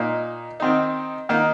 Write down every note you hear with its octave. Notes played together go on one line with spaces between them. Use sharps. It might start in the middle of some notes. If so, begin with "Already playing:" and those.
Already playing: A#2 A#3 D#4
D#3 C4 D#4
D#3 A#3 D#4